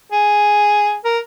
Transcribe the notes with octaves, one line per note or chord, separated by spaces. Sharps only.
G#4
A#4